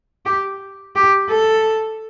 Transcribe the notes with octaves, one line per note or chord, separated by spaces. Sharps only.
G4
G4
A4